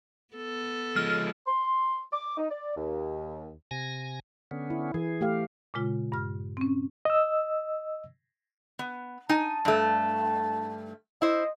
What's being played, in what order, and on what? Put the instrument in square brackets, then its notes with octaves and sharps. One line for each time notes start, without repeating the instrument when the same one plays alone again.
[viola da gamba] B3 A4
[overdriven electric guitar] F3 G#3 [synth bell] F6
[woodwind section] C6
D6
D#4
D5
D#2
[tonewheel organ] C3 G#5 A#6
D3 B3 C#4
[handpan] E4
[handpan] E3 [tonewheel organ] G#4
[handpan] A3 G4 F5
[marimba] A#2 C#3 G#3 F4
G2 F6
C4 C#4
[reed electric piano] D#5 E6
[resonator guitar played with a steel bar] B3
[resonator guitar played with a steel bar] D#4 G#5 [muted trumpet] A5
[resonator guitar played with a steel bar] G2 A3
[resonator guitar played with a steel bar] E4 C5 [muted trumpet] D#5